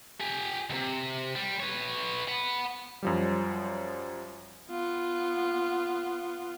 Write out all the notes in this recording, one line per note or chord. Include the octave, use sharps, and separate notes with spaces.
G4 G#5
D#2 C3
G3
B4 C#5
F#5 B5
F#2 F3 G3
B3 F4